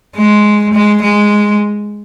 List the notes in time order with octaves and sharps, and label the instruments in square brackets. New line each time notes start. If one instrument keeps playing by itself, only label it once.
[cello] G#3
G#3
G#3